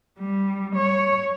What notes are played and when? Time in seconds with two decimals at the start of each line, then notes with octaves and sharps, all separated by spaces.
0.20 G3
0.76 C#5